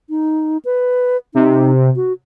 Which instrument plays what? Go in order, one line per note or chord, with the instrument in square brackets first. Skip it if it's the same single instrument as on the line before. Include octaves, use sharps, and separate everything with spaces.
[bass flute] D#4
B4
[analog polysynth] C3 [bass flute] D#4
[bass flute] F#4